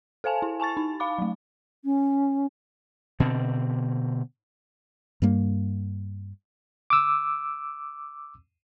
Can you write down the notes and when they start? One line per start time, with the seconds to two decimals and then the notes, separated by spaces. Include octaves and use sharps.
0.24 A4 C5 F5 G#5 A5
0.42 E4
0.60 G#5 A5 C#6 A6
0.77 D#4
1.00 F5 B5 D6
1.19 F#3 A3
1.85 C#4
3.20 B2 D3 C4
5.22 G2 G3 A#3
6.90 D6 E6